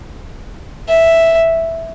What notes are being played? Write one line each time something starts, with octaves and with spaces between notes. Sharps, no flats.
E5